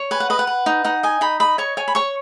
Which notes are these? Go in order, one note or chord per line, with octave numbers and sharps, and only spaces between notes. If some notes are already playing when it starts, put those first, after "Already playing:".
Already playing: C#5
B4 G#5
F#5
B4 D#5
F#5
B4
D#4
D#4 F#5
D#5 G#5
D#4 B5
D#5 B5
C#5 C#6
C#5 G#5
B5
C#5 C#6